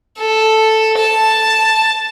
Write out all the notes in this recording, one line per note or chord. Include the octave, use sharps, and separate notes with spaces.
A4
A5